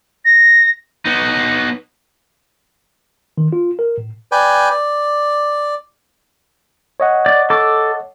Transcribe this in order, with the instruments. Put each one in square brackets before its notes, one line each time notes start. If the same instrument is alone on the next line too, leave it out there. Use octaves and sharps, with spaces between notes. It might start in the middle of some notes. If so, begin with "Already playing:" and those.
[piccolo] A#6
[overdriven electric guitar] B3 D#4
[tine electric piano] D#3
F4
A#4
A2
[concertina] B4 D5 G5 G#5
D5
[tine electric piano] C#5 D#5 F#5
[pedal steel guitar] D5
A4 D6